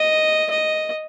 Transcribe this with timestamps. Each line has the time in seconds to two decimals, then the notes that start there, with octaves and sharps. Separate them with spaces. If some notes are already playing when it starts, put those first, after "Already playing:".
Already playing: D#5
0.50 D#5